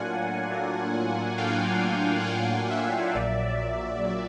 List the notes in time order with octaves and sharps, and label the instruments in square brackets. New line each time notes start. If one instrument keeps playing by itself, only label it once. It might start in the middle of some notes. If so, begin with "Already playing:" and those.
Already playing: [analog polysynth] A2 F#3 A#3 D4 F4 F#5 G#5
A2 F#3 A#3 D4 F4
A2 F#3 A#3 D4 F4 F5 G5
F#5
A2 F#3 A#3 D4 F4 F5 G5
E5 F#5
A#1 A#2 F#3 D5 E5
A#2 F#3